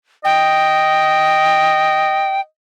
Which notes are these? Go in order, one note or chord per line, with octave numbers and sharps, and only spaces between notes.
D#5 G5